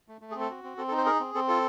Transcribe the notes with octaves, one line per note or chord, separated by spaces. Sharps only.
A3
A3
G#4
C4 A4
F#4
C4
C4 A4
A4
D#4
C5
G#4 A#4
C4
C4 A4
F4 A4